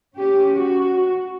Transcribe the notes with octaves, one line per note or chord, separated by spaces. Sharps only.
C#4 G4
F#4